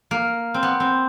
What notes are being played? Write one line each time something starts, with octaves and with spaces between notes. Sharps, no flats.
A#3
C4
B3
C4